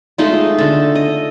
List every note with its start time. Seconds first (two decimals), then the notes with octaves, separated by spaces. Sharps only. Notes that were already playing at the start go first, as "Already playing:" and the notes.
0.18 G#3 A3 D#4 F4
0.58 D3 A4
0.95 D#5